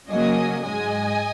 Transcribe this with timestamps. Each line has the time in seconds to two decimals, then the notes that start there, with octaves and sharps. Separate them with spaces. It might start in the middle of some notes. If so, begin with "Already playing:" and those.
0.10 C#3 F#3 A#3 D#5 G#5
0.63 G#2 G#3 D#5 G#5